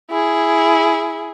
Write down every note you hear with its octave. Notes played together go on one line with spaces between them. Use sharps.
E4 G#4